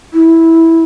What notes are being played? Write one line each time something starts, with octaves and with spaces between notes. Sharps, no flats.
E4